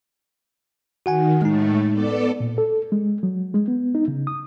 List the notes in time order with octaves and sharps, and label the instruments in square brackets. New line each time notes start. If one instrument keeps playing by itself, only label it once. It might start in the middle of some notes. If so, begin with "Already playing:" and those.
[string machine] D#3 [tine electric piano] F#4 F#5 G#5
[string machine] A2 A3 [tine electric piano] G#3 D#4
[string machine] B3 A4 D5
[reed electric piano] A#2
A4
G#3
F#3
G#3
B3
D#4
C#3
D#6